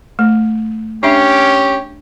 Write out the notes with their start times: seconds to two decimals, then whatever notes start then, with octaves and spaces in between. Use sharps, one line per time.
0.19 A3
1.03 C#4 D4 G4 E5